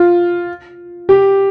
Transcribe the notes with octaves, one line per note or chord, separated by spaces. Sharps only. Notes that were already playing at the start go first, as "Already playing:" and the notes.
Already playing: F4
G4